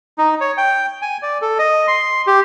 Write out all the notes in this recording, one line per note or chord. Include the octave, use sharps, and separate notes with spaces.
D#4
C#5
G5
G#5
D5
A4
D#5
C6
G4